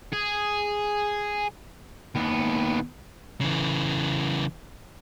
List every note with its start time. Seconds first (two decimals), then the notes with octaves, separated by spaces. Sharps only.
0.13 G#4
2.15 D#2 B3
3.41 C#3 E3